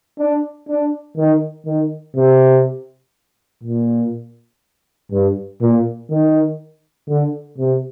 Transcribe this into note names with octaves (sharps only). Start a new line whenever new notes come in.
D4
D4
D#3
D#3
C3
A#2
G2
A#2
D#3
D3
C3